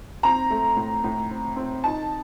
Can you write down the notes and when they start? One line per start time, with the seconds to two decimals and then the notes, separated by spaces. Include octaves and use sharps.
0.23 C4 A#5
0.50 A3
0.77 A2
1.04 A2
1.30 C4
1.56 C4
1.83 D#4 A5